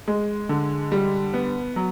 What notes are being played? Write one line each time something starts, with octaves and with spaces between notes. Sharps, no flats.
G#3
D3
G3
B3
F#3